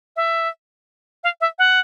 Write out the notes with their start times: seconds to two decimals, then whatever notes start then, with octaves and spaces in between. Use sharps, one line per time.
0.16 E5
1.24 F5
1.41 E5
1.59 F#5